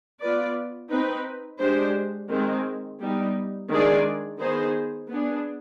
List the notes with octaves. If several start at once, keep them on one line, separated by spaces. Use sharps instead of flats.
B3 F4 B4 D5
C4 D#4 B4
G#3 D4 G4 C5
D#3 G#3 C4
G3 B3 D#4
D#3 G#3 D4 G#4 D5
D#3 B3 D#4 G#4 C5
B3 D4 G#4